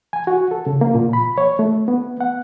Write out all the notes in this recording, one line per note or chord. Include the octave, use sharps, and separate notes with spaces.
G#5
F#4
A4
C#3
A#3
A#2
B5
C#5
A3
B3
F#5